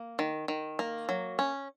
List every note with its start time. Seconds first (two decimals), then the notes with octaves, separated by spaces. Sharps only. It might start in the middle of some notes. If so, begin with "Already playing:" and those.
Already playing: A#3
0.19 D#3
0.48 D#3
0.79 A#3
1.09 F#3
1.39 C#4